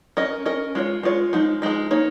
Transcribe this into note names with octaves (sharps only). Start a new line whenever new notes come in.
C#4 A#4 D#5
C#4 A#4 D#5
G#3 F4 C#5
G#3 F4 C#5
F3 G#3 D#4
F3 G#3 D#4
A#3 D#4 C#5